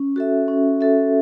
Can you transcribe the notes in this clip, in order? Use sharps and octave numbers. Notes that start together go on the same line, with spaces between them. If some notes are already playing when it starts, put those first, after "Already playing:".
Already playing: C#4
F#4 A4 E5
C#4
F#4 A4 E5